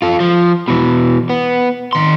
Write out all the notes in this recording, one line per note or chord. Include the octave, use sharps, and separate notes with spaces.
F4 A4
F3
B2 E3
B3
D#3 C6